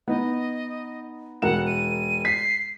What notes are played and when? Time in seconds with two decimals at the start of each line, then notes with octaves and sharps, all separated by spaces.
0.08 B3 D#4 D#5
1.42 E1 A#4 F#5 E7
1.67 D#7
2.25 B6 C7